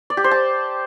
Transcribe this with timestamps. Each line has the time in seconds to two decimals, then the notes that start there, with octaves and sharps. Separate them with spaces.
0.10 D5
0.17 G4
0.24 C5
0.31 A5